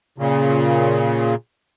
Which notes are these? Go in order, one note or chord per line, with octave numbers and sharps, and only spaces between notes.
A#2 C#3